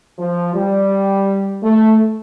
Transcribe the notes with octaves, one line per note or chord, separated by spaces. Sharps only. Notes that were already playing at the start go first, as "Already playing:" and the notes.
F3
G3
A3